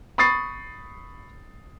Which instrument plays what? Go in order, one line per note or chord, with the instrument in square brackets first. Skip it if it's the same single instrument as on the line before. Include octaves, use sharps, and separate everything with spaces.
[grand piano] B5 C#6 D#6 A6 C7